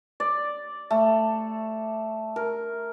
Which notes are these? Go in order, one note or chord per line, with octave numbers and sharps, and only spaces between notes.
D5
A3
A#4